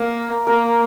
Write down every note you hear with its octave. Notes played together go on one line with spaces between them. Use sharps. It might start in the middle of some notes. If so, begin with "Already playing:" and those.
Already playing: A#3 A#4
A#3 A#4